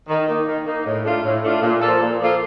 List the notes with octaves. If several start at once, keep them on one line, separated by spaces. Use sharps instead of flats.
D#3
A#3 D#4
D#3
A#3 D#4
A2
A3 D4 F4
A2
A3 D4 F4
A#2
F3 A#3 F4 A4
A#2
F3 A#3 F4 A4